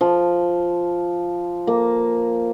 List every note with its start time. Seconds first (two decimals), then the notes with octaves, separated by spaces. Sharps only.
0.01 F3
1.67 A#3